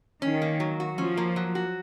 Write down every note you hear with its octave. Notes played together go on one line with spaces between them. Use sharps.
D#3 C#4
A#3
F#3
F#4
F3 C#4
A#3
F#3
F#4